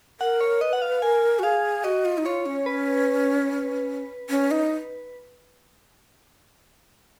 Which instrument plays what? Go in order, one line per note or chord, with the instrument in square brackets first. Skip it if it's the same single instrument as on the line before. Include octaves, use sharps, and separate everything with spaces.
[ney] A#4 [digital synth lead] F#5
[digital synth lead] C#5
[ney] B4 [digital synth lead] D#5
[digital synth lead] F#5
F5
[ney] A#4 [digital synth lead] G#5
[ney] F#4
[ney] G#4 [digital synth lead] F5
[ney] F#4 [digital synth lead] D#5
[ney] F4
D#4
[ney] F4 [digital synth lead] C#5
[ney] C#4
[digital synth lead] B4
[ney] C#4
D#4